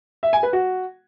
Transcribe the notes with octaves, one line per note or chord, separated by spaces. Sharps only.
E5
G#5
B4
F#4